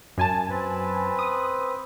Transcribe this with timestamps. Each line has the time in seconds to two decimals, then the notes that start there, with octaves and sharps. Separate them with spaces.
0.18 F#2 G#5 A5
0.50 C4 B4
1.19 D#6